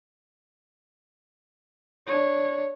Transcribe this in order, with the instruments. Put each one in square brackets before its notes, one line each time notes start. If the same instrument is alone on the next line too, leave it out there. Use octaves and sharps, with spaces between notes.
[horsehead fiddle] D4 C#5